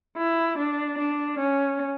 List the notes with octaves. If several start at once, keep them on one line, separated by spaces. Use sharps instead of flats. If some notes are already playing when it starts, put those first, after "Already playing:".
E4
D4
D4
C#4